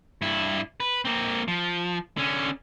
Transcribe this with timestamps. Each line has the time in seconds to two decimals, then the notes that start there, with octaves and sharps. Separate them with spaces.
0.22 G2 E4
0.80 B4
1.05 A#3 C4
1.48 F3
2.17 D3 C#4